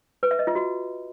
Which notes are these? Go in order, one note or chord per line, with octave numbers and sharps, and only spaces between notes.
B4
E5
D#5
F4
F#4